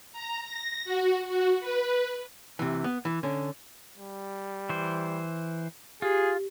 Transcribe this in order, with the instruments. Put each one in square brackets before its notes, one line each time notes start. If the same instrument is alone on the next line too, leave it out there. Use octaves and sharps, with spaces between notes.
[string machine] A#5
A#6
F#4
F#4
B4
[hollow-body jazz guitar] C3 E3
B3
E3
D3 C#4
[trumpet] G3
[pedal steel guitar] E3 C5
[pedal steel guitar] F4 [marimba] G4 [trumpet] G#4